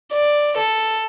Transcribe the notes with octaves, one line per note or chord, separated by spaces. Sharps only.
D5
A4